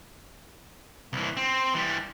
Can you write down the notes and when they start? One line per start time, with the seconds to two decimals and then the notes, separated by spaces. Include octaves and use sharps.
1.13 C2 E3
1.37 C4
1.74 E3 G3